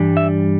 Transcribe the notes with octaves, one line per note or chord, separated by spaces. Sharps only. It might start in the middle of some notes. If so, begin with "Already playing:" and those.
Already playing: G2 E3 G3 D4
E5